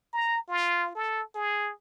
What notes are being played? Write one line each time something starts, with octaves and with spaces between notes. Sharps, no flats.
A#5
F4
A4
G#4